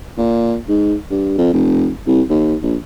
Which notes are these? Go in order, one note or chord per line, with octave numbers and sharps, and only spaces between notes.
A#2
G#2
G2
F2
F1
C2
D#2
A#1